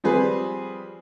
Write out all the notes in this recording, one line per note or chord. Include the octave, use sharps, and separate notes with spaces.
F3 G3 C4 G#4 B4